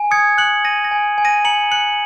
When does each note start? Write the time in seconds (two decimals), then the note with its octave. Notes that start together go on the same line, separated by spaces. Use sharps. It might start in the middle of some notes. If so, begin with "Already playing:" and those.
Already playing: G#5
0.11 D#6 G#6 C#7
0.38 F#6 C#7 F#7
0.65 G#5 A#6 D#7
0.84 A#6
0.91 G#5
1.18 G#5
1.25 A#6 D#7
1.45 A#5 C#7 F#7
1.71 F#6 C#7 F#7